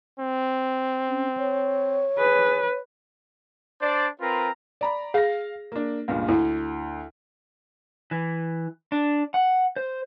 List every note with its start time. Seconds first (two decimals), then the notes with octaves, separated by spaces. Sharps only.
0.19 C4
1.09 C#4
1.37 C#5
2.18 G#4 B4
3.81 D4 C5 D5
4.21 C4 F4 A#4 B4 A#5
4.81 D5 A#5 B5
5.14 G#4 F5 A#6
5.72 A#3 D4
6.08 C#2 G2 A#2
6.28 D2 E4
8.11 E3
8.92 D4
9.34 F#5
9.76 C5